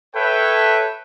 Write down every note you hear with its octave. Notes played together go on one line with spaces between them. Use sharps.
A4 B4 C#5 E5 G5